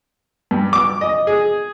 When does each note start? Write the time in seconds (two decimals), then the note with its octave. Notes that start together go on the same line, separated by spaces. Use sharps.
0.51 G2
0.73 D6
1.01 D#5
1.27 G#4